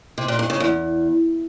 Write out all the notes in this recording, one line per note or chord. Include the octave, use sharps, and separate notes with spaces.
C3
A#2
G2
C#3
E2